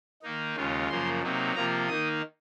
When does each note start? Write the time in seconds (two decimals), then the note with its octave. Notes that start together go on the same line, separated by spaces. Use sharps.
0.22 D#3 A#3 D#4
0.55 D#2 C#3 G#3 C#4 F4
0.89 F#2 C#3 F3 A#3 C6
1.23 C3 F#3 A#3 D#4
1.55 C3 F3 A#3 F4 A#5
1.88 D#3 A#3 D#4 D#6